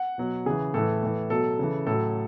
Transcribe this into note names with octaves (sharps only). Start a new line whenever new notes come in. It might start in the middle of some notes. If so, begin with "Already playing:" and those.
Already playing: F#5
B2 F#3
C#3 E3 G#4
A2 E3 A4
A2 E3
B2 F#3 A4
C#3 E3
A2 F#3 A4